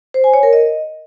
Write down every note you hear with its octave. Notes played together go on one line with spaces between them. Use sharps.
C5
G#5
C#5
A#4
D#5